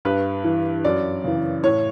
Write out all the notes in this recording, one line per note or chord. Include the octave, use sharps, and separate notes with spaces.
G2 B4
E3
F#2 D5
C#3 E3
A2 C#5